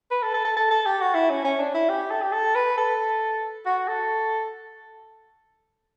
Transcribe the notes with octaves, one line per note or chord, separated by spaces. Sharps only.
B4
A4
A4
A4
A4
A4
G4
F#4
E4
C#4
C#4
D4
E4
G4
A4
G4
A4
B4
A4
F#4
A4